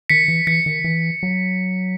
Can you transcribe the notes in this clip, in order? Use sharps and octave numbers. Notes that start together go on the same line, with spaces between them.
D#3 B6 C#7
E3
E3 B6 C#7
D#3
E3
F#3